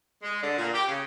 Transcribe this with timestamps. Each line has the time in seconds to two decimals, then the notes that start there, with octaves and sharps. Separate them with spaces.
0.22 G#3
0.42 D3
0.57 A#2
0.72 G4
0.87 C#3